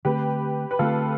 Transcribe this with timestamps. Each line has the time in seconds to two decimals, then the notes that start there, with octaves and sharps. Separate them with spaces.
0.05 D3 A3 C4 G4 B4
0.71 B4
0.79 D3 A3 C4 F4 A4